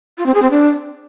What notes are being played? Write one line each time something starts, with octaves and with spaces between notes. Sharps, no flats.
F4
C4
G#4
C4
D4